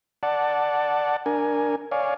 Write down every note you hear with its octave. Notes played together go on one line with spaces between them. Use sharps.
D5 F#5 A5
D4 A#4 G#5
C#5 D5 F5 G#5